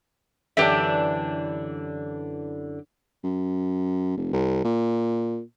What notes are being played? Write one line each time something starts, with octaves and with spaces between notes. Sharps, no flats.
F#2 D3 E3 D4 G4 E5
F#2
F1
C2
A#2